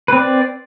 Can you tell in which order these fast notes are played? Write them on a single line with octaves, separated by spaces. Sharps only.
B4 C4 D5